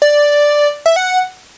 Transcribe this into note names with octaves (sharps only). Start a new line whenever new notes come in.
D5
E5
F#5